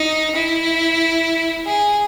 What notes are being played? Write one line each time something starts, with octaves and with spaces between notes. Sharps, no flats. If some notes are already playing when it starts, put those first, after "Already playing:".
Already playing: D#4
E4
G#4